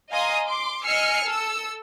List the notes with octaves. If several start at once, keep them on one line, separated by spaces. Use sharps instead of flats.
D#5 F5 G#5 A#5 C6 D#6
C6 D6
D#5 G#5 E6 F6 C7 C#7
A4 E6